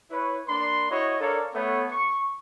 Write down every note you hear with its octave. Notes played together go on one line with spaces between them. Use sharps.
E4 B4 C#5
A#3 D4 B5 C6
E4 F#4 C#5 D#5
D4 A4 A#4 C#5 D5 F5
A3 B3 C#5
C#6